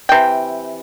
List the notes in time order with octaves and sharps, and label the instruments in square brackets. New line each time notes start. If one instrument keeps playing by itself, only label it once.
[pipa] C3 E3 G5